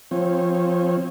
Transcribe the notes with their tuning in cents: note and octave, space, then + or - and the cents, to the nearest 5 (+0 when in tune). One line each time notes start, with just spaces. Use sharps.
F3 +0 C4 +0 C#5 -25